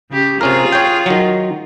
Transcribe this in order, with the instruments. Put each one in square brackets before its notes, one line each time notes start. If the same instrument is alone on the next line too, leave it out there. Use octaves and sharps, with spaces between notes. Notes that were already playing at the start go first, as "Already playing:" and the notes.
[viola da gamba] C#3 G4
[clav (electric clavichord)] C3 C#4 A#4 [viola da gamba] F4 G#4
[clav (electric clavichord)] C#5 G5
D#3 F#3